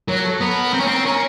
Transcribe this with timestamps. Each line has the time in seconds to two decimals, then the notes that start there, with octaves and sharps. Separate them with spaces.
0.08 F#3 A#4
0.24 A4
0.41 B3 A#4
0.74 C4
0.80 C#4
0.87 C4
1.05 C#4